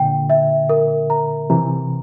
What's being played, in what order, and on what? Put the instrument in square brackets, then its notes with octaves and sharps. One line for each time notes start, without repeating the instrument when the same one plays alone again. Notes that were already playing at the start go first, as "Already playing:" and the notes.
Already playing: [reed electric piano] A#2 D3 [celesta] G5
[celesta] E5
A#4
A#5
[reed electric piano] C3 E3 [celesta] A#5